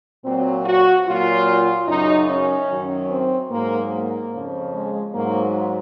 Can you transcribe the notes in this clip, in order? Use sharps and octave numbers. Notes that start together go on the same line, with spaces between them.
A#2 F#3 C4
F#4
A#2 F#3 F4
F#2 C#3 F#3 D#4
C#4
F#2 D#3 F#3
C4
G#2 F#3 A#3
A#3
F2 C#3 F3
G#3
G#2 F#3 A#3